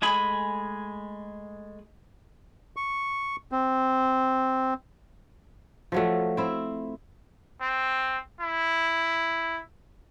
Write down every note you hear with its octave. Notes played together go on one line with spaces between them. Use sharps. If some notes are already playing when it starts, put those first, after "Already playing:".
G#3 A3 G#4 G#5 B5
C#6
C4
F3 F#3 A3
C4 E4
C4
E4